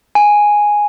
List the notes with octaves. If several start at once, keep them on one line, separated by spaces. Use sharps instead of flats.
G#5